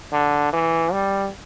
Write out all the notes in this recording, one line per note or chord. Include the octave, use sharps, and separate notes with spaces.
D3
E3
G3